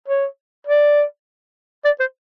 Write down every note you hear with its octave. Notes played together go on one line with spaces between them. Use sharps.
C#5
D5
D5
C5